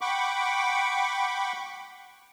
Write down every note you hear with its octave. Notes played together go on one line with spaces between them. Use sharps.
F#5 G5 B5 C#6 D6